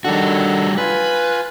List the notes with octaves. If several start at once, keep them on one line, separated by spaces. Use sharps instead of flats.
D#3 G3 D4 F#4 A4
F4 B4 G#5